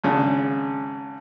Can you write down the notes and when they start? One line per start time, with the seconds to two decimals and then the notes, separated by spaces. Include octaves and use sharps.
0.04 G#1 C#3 D4